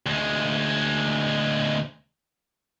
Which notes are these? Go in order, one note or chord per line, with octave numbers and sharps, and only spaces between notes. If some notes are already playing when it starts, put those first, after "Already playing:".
D2 G#3